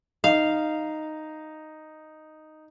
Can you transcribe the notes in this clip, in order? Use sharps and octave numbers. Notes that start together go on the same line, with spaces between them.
D#4 F5